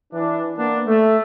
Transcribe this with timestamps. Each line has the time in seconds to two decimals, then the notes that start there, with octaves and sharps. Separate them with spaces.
0.12 E3 D4
0.57 A#3 B3 D4
0.86 A3